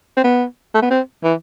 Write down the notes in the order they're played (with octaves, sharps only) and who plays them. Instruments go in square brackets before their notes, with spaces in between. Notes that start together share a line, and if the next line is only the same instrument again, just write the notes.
[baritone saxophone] C4
B3
A3
B3
C4
E3